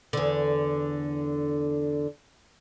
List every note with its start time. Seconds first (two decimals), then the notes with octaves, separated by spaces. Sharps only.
0.13 E2 D3